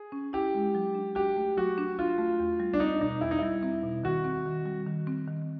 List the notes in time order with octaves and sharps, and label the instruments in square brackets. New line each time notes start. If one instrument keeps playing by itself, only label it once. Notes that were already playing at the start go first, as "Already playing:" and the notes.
Already playing: [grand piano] G#4
[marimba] C#4
[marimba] E4 [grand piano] G4
[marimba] G#3
F#3
D4
[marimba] F#4 [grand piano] G4
[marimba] A3
[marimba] F#3 [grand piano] F#4
[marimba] D4
[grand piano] F4 [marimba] F#4
[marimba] A3
E2
G3
[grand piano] D4
[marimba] C4 [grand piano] D#4
[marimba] B2 [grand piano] D#4
[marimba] E2 [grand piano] E4
[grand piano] D#4
[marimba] G3 [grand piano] E4
[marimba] C4
B2
[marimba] D#3 [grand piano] F#4
[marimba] C4
D#3
G3
D#3
C4
D#3